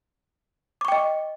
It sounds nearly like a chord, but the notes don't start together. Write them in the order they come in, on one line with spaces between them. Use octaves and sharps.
D6 C#6 G5 D#5